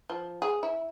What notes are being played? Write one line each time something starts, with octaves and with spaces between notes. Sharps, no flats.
F3
G#4
E4